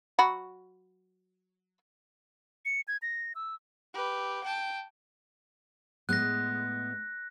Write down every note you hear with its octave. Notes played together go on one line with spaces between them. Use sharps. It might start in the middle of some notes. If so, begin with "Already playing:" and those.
F#3 F#4 B5
C#7
G#6
A#6
E6
G4 B4
G5 A5
A2 G#3 B3 F#6 A#6